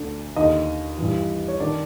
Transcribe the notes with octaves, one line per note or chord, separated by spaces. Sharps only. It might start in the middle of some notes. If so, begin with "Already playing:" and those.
Already playing: D2 D3
D#2 D3 D#4 D#5
G2 E3
C#5
D#3 D4 D5